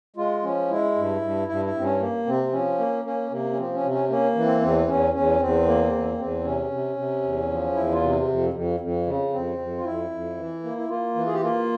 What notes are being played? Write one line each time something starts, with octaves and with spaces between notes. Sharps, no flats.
G#3 F4
F3 C#4
G#3 E4
G2
G2
G2 E4
E4
G2 C4
C#4
A#3
C3 C4
F3 C#4
A#3
A#3 C#4
C3 A#3
C#4
F3 C4
C#4
C3
C#4
A#3 C#4
E3
C4
E2 C4
E2 C#4
E2 C#4
E2 C4
A#3
E2
E2 C4
C3 C#4
C3
C3
E2
F3
E2 E4
F4
C3
F2
F2
F2
C#3
F2 C4
F2
F4
F2 E4
F2
E3
A#3
E4
A#3 F4
E3
G#4
G4
A#3 F4